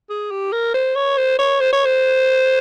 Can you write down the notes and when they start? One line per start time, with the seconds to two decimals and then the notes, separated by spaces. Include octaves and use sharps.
0.10 G#4
0.31 G4
0.52 A#4
0.74 C5
0.96 C#5
1.17 C5
1.39 C#5
1.60 C5
1.73 C#5
1.85 C5